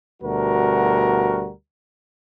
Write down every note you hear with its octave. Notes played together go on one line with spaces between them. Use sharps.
D2 B2 G3 F#4 A#4